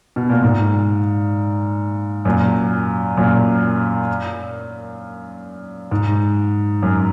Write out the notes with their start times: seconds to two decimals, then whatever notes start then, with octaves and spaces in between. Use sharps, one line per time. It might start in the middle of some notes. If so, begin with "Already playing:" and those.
0.16 B2
0.29 A#2
0.43 G#2
2.25 F#2 A#2
3.17 F#2 A#2
5.91 G#2
6.82 F#2